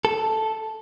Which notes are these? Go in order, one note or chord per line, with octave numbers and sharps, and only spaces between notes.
A4